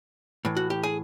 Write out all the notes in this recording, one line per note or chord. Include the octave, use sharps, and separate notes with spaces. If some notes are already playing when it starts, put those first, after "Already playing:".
A2 E3
F#4
G4
G#4